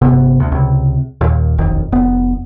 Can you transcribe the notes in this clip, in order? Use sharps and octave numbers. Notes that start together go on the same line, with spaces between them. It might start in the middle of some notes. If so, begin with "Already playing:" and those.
G1 C3 B3
D2
C#2 C3
D#2 A#2
E1 B1 F2 D#3
F1 B3